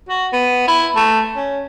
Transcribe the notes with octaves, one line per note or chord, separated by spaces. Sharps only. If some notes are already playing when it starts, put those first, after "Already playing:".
F#4
B3
E4
A3
C#4